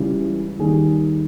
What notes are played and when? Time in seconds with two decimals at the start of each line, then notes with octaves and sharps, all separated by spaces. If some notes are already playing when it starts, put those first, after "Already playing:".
Already playing: C#2 C#3 E3 G3
0.59 D#2 D#3 G3 G#4